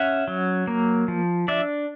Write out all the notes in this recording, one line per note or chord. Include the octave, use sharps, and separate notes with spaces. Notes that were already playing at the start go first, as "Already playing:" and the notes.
Already playing: C#4 E5 F#5
F#3
A#3
F3
D4 D5 E5